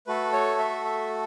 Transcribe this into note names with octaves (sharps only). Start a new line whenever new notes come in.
A3 F#4 A4 B4
C#5
E5
E5